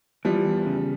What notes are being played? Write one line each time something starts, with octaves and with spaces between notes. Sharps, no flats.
E3 F3 G3
E2
C#3